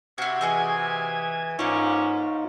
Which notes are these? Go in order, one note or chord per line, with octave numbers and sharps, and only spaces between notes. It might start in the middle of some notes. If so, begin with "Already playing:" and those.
C3 E4 F#4 G#6
E3 F#4 G#4 D#5
G#2 A3 A#3 C#4 D#4 F4